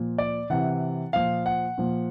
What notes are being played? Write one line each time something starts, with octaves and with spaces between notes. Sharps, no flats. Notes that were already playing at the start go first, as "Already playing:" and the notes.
Already playing: A#2 F3
D5
C3 E3 F#5
A#2 F3 F5
F#5
A#2 F3